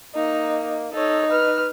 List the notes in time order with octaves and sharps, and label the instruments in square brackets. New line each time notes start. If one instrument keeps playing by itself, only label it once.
[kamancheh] A#3 [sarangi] D#4
[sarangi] D#4 [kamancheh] A4 C#5
[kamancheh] B4 F6